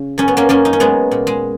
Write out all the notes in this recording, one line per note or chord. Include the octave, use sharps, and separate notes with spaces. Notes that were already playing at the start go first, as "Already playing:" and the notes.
Already playing: C#3
F#2 C#4
B3
A#3 C#4
F#2 A#3 C#4
D#4
C#4
F#3 G#3 B3
A#2
G#3